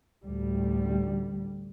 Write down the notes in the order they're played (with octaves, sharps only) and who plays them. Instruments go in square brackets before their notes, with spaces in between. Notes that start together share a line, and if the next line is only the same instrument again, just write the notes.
[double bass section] A1 D2 G3